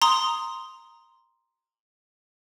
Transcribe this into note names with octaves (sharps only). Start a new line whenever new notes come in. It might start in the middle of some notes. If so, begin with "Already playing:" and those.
A#5 C6 D#6